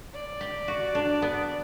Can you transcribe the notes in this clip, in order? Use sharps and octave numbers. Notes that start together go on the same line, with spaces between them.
D5
G4
F#4
D4
B3